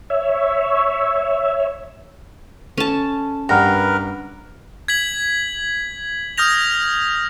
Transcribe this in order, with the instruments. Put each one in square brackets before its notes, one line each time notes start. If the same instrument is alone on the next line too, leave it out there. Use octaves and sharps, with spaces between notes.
[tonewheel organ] C#5 E5
[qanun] C#4 A5 [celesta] A4
[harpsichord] G2 [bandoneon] A#4 B4 [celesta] F#5 F6 A#6
[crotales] G#6 B6 F#7
D#6 F6 G6 A#6 F7